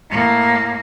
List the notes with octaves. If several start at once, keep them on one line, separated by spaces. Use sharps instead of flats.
A2 A#3